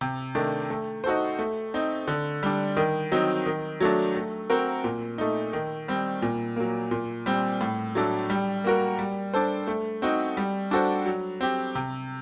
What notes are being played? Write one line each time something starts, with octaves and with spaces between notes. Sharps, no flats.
C3
D#3 A3 D4
A3
D#4 F#4 A4 C5
A3
C4 D#4
D3
G3 D4
D#3
F#3 C4 D#4
D#3
F#3 A3 D4
A3
C4 F#4 A#4
A#2
A3 D#4
D#3
G3 C4
A#2
F#3 A#3
A#2
G3 C4
A2
F#3 A3 D4 A4
G3
A#3 F#4 A#4
G3
D4 A4 C5
A3
C4 D#4 F#4
G3
D4 F#4 A4 C5
F#3
C4 G4
C3